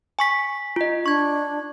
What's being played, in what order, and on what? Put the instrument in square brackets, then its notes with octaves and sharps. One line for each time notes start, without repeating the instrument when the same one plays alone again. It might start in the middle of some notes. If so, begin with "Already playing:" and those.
[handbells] G#5 C#6 B6
F4 D#5
[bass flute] D4 [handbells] C#6 G#6